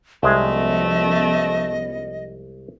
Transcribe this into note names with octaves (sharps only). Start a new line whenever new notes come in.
C2 F3 G#3 A3 B3 C#4 G#4 D#5